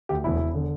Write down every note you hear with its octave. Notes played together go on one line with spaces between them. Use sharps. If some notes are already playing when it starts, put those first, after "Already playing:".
D2 G4
E1 E4
E1
D3